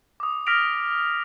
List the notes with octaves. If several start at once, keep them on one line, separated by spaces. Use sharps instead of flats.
D6 D#6
D6 F6 A#6 B6 D7 F7